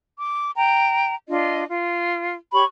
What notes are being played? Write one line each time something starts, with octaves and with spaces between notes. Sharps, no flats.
D6
G5 A#5
D4 F4 D#5
F4
G4 C#5 B5 C#6